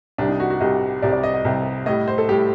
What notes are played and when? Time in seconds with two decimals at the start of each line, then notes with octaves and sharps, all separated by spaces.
0.18 C2 C3 G3 D4
0.29 D#4
0.40 F#4
0.50 F#4
0.61 C2 C3 G3 D#5
1.02 C2 C3 G3 D5
1.12 D5
1.23 D#5
1.34 D#5
1.45 C2 C3 G3
1.86 A2 G3 D#5
2.08 C5
2.18 A4
2.29 A2 G3 G4